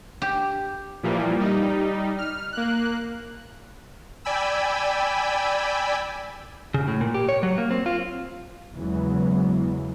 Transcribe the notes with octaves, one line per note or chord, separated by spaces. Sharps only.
G4
A#2 E3 F3 G3 A#3
G3 D#4
F6
A#3 F#6
D5 G5 G#5 B5 E6
C#3
A2
A#2
G4
C#5
F#3
A#3
C4
F4
E2 C#3 E3 F#3 G#3 B3